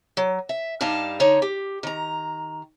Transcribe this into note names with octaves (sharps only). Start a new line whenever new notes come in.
F#3
E5
G2 G3 D#4 F5 A5
D3 D#4 C#5
G4
D#3 A#5